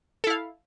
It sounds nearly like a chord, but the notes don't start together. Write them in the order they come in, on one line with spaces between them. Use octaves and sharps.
A4 E4 F5